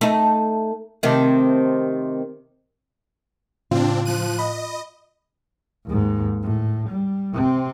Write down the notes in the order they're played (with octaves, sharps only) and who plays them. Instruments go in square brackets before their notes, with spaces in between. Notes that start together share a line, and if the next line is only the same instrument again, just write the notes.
[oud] A3 D#4
C3 D#3 A3
[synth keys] A2 [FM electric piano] C#3 [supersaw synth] C4 D4 [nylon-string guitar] F4
[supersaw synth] F3 F#6 D#7
[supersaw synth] D#5 [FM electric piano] B5
[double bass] D#2 G#2
A2
G3
C3 C4